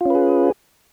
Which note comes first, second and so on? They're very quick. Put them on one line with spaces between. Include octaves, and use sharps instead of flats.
F4 C#4 B4 G#4